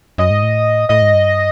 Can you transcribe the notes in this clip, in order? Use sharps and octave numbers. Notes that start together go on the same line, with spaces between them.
F#2 D#5
G#2
A2
A2 D#5
G#2
G2